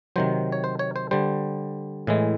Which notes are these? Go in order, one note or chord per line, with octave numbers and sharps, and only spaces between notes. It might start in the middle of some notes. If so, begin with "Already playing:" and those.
C3 D#3 F#3 C5
C#5
C5
C#5
C5
D3 G3 C5
A2 E3 G#3